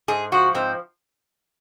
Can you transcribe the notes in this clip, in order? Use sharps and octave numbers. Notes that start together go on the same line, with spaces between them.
G#2 G#4
F3 F#4
G#2 C4